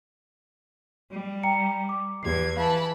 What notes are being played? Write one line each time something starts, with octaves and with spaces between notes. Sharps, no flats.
G3
G5 A#5 C#7
D6
E2 G4 G#6 C7
E3 F5 A5 B5